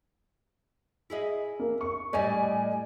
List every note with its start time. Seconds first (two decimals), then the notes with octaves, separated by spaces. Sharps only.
1.10 E4 G#4 D#5
1.60 A#3
1.81 C#6
2.13 A2 G3 D5 D#5 G#5